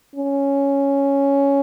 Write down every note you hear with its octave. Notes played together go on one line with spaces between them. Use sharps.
C#4